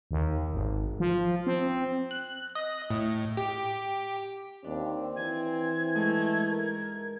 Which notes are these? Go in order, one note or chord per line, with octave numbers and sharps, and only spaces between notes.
D#2
G#1
F3
C4
F#6
D#5
A2
G4
D#2 C4 D4
E3 G#5 G#6
G#2 G#3 A3
A#4